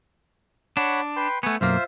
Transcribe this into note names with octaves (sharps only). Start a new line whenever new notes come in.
D4 C#5 F#5 B5
B4 G5 C6
A3 B3 F#5 G#5 C#6
B1 F#2 A#3 F4 C5 E5